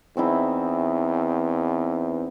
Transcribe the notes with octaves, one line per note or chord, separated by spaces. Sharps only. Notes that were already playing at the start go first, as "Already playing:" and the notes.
E2 C4 D#4 E4